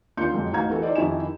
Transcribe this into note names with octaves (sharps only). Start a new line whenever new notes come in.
D#2 D4 F4 F5 G6 C#7
F2 F#3 G#3
A1 D#4 F#4 F5 A#5 G#6
E3 F#4 A4
D#4 C5 D5 D#5
F2 D#3 E4 G4 G#5 E7